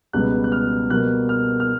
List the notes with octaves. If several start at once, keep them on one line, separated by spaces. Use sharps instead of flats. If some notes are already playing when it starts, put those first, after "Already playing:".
C#2 B2 G3 B3 F#6
F#6
F6
B2 G3 A#3 F#6
F6
F6